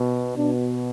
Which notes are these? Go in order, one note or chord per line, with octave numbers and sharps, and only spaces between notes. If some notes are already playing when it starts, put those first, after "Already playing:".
Already playing: B2
B2 D4